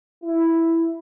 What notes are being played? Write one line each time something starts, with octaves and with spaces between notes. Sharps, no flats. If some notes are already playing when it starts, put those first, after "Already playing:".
E4